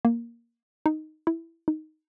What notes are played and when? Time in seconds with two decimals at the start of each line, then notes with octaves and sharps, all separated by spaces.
0.05 A#3
0.86 D#4
1.27 E4
1.68 D#4